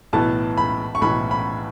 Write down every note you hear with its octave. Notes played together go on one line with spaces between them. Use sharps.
B1 A2 E3 B3 A5
B5
C#6
B1 A2 E3 B3 B5
B5